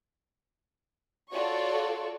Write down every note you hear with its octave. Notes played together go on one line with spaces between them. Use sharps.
F4 F#4 A4 C#5 D5 C#6